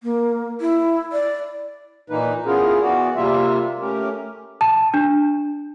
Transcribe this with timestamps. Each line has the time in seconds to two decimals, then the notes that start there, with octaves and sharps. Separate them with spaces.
0.03 A#3
0.61 E4
1.12 D5
2.10 A#2 E3 A#3 D#4 B4
2.46 B3 C#4 E4 F4 G#4 A#4
2.82 E3 B3 F#4 D5
3.16 C3 G3 A#3 F4 E5
3.80 A3 C#4 G4 A#4
4.61 A5
4.94 D4